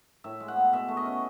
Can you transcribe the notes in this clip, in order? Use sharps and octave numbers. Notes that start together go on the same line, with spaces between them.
A2 E5
G#3
F#5
B3
B2 E5
A3
D#5
C#4